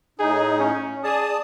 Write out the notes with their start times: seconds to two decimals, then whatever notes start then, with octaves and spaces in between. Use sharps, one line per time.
0.19 A2 D#4 G#4
0.60 C#4
1.04 G#4 D5 A5 D#6